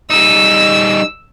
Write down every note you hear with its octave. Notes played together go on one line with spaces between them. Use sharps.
G3 D#4 E6